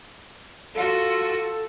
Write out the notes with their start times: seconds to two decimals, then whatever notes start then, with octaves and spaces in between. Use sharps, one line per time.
0.75 F4 F#4 A4